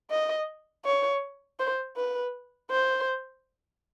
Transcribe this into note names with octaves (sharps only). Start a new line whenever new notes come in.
D#5
C#5
C5
B4
C5